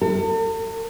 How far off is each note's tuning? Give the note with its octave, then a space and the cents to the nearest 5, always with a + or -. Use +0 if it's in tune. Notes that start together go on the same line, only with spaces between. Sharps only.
A4 +45